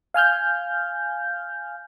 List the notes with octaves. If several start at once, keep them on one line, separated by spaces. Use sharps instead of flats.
F5 G#5 F6 G6